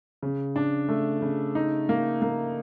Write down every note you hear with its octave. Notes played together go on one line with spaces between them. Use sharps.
C#3
D4
A3
C#3
D#4
A#3
A#3